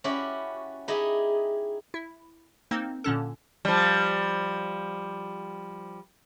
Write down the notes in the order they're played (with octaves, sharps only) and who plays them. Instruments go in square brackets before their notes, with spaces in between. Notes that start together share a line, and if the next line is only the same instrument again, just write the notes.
[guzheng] C#4 E4 F#4 G4 D5 B5
D#4 E4 G4 G#4 D#5
[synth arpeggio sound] E4
A#3 C4 D#4
A#2 D3 C#4 A4
[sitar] F3 G3